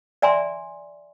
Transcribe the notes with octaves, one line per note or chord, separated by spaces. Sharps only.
D5 E5 G#5 A#5 C6